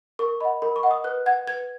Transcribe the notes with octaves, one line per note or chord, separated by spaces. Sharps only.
A#4 C#6
D#5 F#5 B5
A#4 B5
C#6
D#5 F#5
D#6
B4 F#6
F#5 G#6
B4 G#6